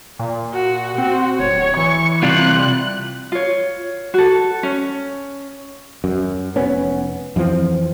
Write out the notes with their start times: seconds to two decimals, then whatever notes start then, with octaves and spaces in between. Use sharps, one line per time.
0.19 A#2
0.54 F#4
0.98 C4 F#4
1.39 D1 C#5
1.77 E3 C#6
2.23 C3 G3 F4 F#6
3.32 F4 C#5
4.14 F#4 A4
4.63 C#4
6.04 F#2
6.56 F1 B3 C#4
7.36 F2 E3 F3 C4